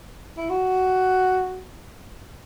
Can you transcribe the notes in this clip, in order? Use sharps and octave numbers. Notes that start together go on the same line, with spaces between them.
E4
F#4